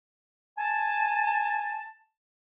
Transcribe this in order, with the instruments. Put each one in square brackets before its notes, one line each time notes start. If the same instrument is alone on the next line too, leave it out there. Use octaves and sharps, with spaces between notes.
[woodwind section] G#5 A5